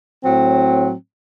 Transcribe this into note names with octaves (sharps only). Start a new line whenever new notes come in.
A2 F#3 C4